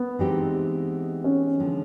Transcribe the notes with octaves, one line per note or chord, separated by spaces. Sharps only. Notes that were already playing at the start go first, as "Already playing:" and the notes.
Already playing: B3
E3 G#3 C4 D#4 G4
C#4
D3 F3 G#3 C4